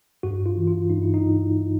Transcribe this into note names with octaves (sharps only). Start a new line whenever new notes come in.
G2 F#4
F4
E3
F4
G2 D#4
E4
D#4
G2